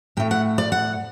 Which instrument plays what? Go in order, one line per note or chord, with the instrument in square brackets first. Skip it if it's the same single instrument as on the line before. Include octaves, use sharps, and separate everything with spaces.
[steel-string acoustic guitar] A2 A3 G5
F#5
D5
F#5